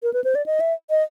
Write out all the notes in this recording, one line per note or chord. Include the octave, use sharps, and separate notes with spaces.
A#4
B4
C5
D5
D#5
E5
D#5